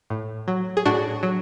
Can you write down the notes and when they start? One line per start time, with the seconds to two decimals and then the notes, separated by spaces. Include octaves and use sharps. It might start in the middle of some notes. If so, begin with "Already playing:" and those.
0.10 A2
0.48 F#3
0.77 G#4
0.85 A2 D4 F#4
1.23 F#3